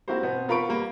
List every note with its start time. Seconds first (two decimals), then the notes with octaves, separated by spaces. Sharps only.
0.08 A#3 C4 E4 F#4 G4 C5
0.23 B2 B3 C4
0.48 B3 F4 A#4 B5 C#6 D7
0.69 G3 A#3